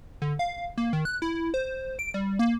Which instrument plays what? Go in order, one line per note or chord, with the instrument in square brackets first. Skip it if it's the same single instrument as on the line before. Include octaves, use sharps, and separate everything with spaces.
[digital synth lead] D3
F5
A#3
D#3
F#6
E4
C5
D7
G3
A#3